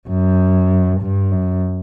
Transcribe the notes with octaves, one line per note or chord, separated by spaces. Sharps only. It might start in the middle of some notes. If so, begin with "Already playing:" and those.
F#2
G2
F#2